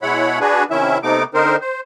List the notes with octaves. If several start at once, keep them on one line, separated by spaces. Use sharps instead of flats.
B2 G#3 E4 C#5 F#5 B5
D4 F#4 G#4 B4
C3 D#3 C#4 E4 E5
C3 A3 B3 D#4 D6
D3 C4 D#4 A#4 C5
C5